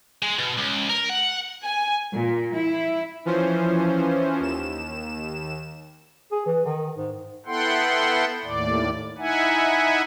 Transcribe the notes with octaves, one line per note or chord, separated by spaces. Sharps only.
G#3
B2
C#2
A#4
F#5
G#5
A#2
E4
E3 F3 C#4 C5
D#2 E7
G#4
E3
D#3
G#2
B3 E4 A4 F#5 G5 C6
D#2 A2 D5
D#4 E4 E5 F#5 G#5